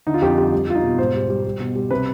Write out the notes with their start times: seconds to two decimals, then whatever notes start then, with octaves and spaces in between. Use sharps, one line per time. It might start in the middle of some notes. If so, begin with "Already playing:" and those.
0.07 D3 D#4
0.14 F4
0.21 F2 G4
0.36 G3 G4
0.53 G3
0.68 G3 F4
0.75 D#4
0.83 B2
0.98 G#2 C5
1.15 G3
1.29 G3
1.44 G3
1.60 B2
1.75 G3
1.91 C3 B4